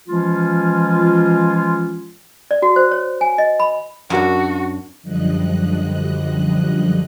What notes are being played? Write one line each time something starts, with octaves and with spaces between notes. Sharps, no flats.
E3 F3 G#3 C#4 F4
D5
F#4
C5
C#5
G#5
D#5
B5
F#2 D4 F#4
F#2 D3 F3 G3 D#5 F#6